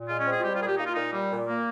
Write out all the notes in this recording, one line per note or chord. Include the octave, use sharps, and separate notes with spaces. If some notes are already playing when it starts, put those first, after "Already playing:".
Already playing: A#2
G#3 F4
C#4
C4
G#4
F4
G3 G4
F4
A#2 G#4
G4
A#3 D#4
F4
A#2 D#4
G3
A#2
A#3